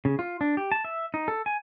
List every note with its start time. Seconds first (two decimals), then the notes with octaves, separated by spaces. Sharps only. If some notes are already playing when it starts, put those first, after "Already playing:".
0.05 C#3
0.19 F4
0.41 D4
0.57 G4
0.72 A5
0.85 E5
1.14 D#4
1.28 A4
1.46 G#5